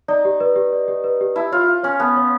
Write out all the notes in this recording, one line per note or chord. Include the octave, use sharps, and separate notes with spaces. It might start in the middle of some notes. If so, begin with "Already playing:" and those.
D#4 D5
G4
B4
G4
D5
G4
B4
G4
E4 A5
F4 C#5
F5
C#4 C#5
B3 A5
C#5